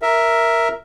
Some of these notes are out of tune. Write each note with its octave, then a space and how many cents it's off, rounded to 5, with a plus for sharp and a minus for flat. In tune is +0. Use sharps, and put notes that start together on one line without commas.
A#4 +0 E5 +0